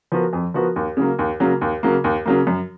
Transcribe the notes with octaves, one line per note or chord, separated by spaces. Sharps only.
F3 B3 F#4 A#4
F2
F3 B3 F#4 A#4
D#2
C#3 F#3 A#3
D#2
C#3 F#3 A#3
D#2
C#3 F#3 A#3
D#2
C#3 F#3 A#3
F#2